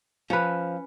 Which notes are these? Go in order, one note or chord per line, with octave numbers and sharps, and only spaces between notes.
F3 C#4 B4